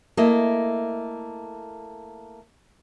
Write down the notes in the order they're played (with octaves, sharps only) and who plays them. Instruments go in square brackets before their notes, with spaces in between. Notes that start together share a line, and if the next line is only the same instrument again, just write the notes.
[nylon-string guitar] A3 A#3 E4 D#5